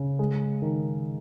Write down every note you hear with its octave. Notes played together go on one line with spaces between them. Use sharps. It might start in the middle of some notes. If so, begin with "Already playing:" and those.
Already playing: C#3
G#3
D#3